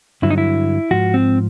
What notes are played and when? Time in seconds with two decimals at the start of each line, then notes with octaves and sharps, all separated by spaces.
0.22 G2 D3 F#3 E4
0.30 D#4
0.38 E4
0.91 G#2 F3 F#4
1.14 C4